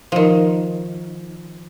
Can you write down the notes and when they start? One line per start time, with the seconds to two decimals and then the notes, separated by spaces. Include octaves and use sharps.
0.12 D#3 F3